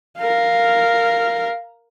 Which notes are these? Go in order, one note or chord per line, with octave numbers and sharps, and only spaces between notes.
A#4 F5